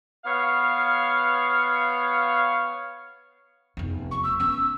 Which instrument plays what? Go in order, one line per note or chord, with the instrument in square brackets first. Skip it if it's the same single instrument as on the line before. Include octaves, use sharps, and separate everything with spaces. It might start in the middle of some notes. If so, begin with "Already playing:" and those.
[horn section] B3 C#5 F5
[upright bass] F1 E2
[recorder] C#6
E6
[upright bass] B3 C#4 [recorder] E6